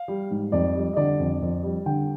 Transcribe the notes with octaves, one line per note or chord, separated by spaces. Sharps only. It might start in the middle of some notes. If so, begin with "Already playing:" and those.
Already playing: F5
G3
G#2
F2 D5
G3
D#5
D3 D5
F2
F2
G3
D3 G5